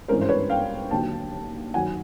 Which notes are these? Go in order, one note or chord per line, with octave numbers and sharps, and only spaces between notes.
G#1 G2 E3 G#3 C#4 A#4 C5
C5
B4 C#5
F5 G5
D#2 D3 F#3 G5 A5
F#2 D#3 F#3 F#5 G#5